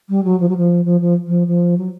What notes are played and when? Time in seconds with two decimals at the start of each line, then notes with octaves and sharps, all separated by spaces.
0.09 G3
0.24 F#3
0.40 F3
0.49 F#3
0.57 F3
0.85 F3
1.01 F3
1.27 F3
1.47 F3
1.78 F#3